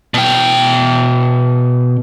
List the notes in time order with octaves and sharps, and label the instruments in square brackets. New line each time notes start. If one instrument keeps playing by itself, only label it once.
[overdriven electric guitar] B2 G5